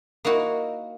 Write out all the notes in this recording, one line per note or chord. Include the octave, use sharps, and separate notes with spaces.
A#3 D#4 E4 F#4 A#4